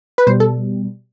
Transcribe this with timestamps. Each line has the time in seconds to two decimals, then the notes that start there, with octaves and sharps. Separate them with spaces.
0.18 B4
0.27 B2 G3 C5
0.40 A4